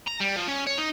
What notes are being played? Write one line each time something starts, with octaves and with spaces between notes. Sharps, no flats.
A#5
G3
F3
C#4
C#5
D#4